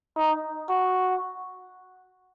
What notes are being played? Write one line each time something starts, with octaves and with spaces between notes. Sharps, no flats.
D#4
F#4